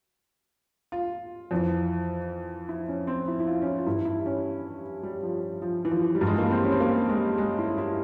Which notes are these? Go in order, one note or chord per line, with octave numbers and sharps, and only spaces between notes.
F4
F2 E3
E4
C#4
C4
E4
E4
F4
C#4
E4
F4
G2 E3 E4
E4
C#4
G3
F3
F3
E3
F3
G3
G2 E3
G#3
A#3
C4
C#4
C4
A#3
G#3
G#3
E4
E4